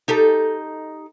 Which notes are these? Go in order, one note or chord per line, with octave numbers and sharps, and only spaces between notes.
D#4 G4 A4